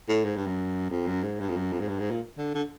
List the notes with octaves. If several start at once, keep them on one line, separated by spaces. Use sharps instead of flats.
A2
G#2
G2
F#2
F2
F#2
G#2
G2
F2
F#2
F2
G#2
G2
G#2
A#2
D3
D3